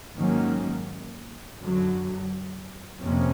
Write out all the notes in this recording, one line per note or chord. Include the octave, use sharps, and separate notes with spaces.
G#2 D#3 F#3 A#3 C#4
F#2 D3 F#3
F2 C3 F3 A#3 C#4